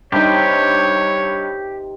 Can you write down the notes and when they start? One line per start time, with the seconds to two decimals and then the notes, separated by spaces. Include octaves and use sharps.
0.12 G2 C3 D#3 D#4 G4 C#5